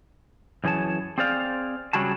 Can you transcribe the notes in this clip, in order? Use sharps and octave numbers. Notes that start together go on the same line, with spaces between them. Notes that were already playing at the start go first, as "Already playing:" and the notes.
F#2 E3 G#4 C#5 A5
C4 G#4 C5 D5 F5
C#3 F#3 G3 F#4 G#4 A5